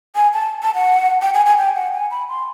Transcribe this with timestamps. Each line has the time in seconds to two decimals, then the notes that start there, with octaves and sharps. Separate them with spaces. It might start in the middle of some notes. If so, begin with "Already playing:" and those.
0.16 G#5
0.33 A5
0.62 A5
0.75 F#5
1.22 G5
1.34 G#5
1.46 G#5
1.58 G5
1.75 F#5
1.94 G#5
2.11 B5
2.29 C6